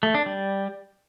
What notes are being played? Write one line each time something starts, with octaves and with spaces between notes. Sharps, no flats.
A3
D4
G3